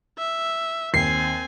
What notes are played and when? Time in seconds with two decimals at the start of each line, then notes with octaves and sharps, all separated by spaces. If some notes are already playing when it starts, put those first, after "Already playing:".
0.19 E5
0.94 D#2 C4 G#5 C7